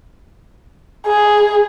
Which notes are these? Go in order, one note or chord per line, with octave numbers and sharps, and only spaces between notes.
G#4